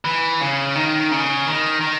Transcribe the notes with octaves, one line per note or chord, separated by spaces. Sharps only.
E3
C#3
D#3
C#3
D#3
D#3